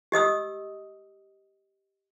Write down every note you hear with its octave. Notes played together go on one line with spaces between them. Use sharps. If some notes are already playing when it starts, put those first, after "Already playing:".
G4 D#5 D#6 E6